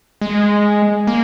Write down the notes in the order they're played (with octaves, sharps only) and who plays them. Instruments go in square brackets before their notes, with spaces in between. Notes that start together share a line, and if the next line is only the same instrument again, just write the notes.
[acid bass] G#3
A#3